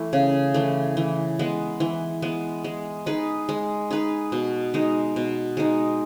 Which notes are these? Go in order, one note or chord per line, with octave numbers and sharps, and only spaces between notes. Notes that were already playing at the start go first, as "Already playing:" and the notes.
Already playing: E3 A3
C#3
E3 A3
E3
G#3 B3
E3
G#3 B3
G#3
D#4 G#4 B4
G#3
D#4 G#4 B4
B2
G#3 D#4
B2
G#3 D#4